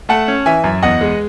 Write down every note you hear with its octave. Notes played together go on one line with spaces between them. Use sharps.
A3 F#5 A5
C#4
E3 E5 G#5
F#2
E2 D#5 F#5
G#3